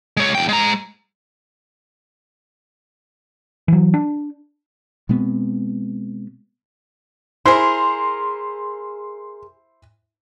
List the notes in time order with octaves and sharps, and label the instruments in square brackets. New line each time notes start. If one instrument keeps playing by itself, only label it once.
[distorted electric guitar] G#3 C#5
E2 G5
G#3 A#5
[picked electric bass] E3 F#3
D4
[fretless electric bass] B2 G#3 B3 C4
[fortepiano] E4 C5 [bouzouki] G#4 A#4 [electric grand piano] C6